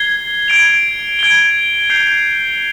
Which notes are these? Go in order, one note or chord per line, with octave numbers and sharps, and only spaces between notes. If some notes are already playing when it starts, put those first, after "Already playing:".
Already playing: G#6 C7 G7
G#6 D7 F7
G#6 D7 G7
G6 C7 F7